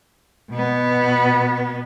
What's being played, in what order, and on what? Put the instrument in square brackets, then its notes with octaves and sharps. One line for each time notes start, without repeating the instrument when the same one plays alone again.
[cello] B2 B3